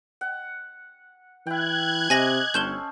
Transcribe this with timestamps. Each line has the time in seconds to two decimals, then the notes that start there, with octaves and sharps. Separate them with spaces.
0.21 F#5
1.47 E3 E4 G5 F#6 G#6
2.10 C3 D#5 G#5 D6 D#6 A#6 F#7
2.54 G1 C#4 A4 C5 G6 E7 G7